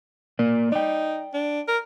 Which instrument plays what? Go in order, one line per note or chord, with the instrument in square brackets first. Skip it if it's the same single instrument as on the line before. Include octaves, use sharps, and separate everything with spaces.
[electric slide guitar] A#3 A#4 D5
[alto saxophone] D#4 [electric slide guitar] D5 G5
[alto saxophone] D4
A#4